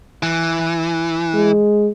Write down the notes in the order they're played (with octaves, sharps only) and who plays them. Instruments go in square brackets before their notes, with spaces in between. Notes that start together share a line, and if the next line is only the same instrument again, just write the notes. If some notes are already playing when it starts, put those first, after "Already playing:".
[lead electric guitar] E3
[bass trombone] G#3